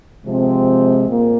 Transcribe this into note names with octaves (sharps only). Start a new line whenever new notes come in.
C3 F3 G#3 C4
A#2 A#3